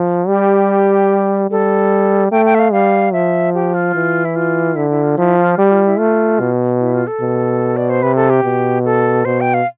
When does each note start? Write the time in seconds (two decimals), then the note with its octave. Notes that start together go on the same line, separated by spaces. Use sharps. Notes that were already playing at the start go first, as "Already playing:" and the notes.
Already playing: F3
0.28 G3 G4
1.50 G3 A4
2.31 A3 G5
2.46 G5
2.55 E5
2.59 F5
2.72 G3 F5
3.13 F3 E5
3.54 G4
3.74 F4
3.95 E3
4.25 E4
4.36 F4
4.76 D3 E4
4.90 E4
5.03 F4
5.17 F3 E4
5.38 F4
5.58 G3 G4
5.71 F4
5.86 E4
5.98 A3 F4
6.40 B2
6.80 E4
6.94 F4
7.07 A4
7.21 B2
7.77 D5
7.89 C5
8.03 C3 B4
8.16 A4
8.30 G4
8.44 B2
8.85 A4
9.25 B2 C5
9.41 G5
9.54 F5